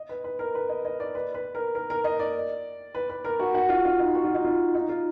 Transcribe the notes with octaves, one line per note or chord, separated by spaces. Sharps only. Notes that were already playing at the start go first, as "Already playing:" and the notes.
Already playing: D#5
B4
B4
A#4
B4
D#5
D#5
D5
B4
B4
A#4
A#4
A#4
D#5
D5
B4
B4
A#4
F#4
F#4
F4
F4
D#4
F#4
F4
D#4
F4
D#4
F4